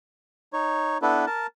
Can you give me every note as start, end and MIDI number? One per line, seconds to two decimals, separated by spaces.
0.53 0.98 63
0.53 0.98 73
1.02 1.25 59
1.02 1.25 62
1.02 1.25 64
1.02 1.25 69
1.02 1.25 71
1.27 1.47 70
1.27 1.47 81